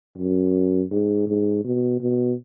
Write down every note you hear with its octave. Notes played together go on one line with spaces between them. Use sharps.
F#2
G#2
G#2
B2
B2